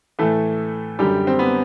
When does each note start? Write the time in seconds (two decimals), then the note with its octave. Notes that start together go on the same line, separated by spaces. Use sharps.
0.19 A2 E3 A3 A4
0.99 F#2 D3 G3 G4
1.27 C4
1.39 B3